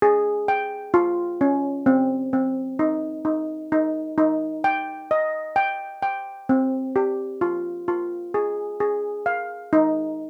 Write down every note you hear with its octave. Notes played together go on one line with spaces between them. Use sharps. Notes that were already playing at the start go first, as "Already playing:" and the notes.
G#4
G5
F4
C#4
C4
C4
D#4
D#4
D#4
D#4
G5
D#5
G5
G5
C4
G4
F4
F4
G#4
G#4
F5
D#4